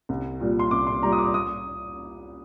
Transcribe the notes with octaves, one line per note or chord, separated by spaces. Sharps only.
C2
A#2 G3
C6
C2 D6
C6
A#2 G3 A#5
D#6
D6
D#6